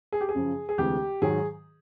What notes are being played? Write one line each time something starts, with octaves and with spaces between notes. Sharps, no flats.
G#4
G4
G#4
F#2 C#3 F3
G#4
D2 C3 E3 G#3 G4
G#2 D#3 F#3 G#4